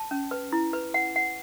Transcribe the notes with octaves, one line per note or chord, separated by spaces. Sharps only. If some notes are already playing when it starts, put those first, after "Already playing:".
Already playing: A5
C#4
B4
E4
B4
F#5
F#5